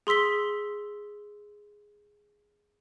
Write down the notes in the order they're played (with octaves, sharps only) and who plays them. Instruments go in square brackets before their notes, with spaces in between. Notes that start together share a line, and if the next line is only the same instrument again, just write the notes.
[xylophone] G#4 C6 E6 B6 G7